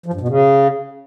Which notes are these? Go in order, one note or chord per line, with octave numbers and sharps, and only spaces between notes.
F3
G2
B2
C#3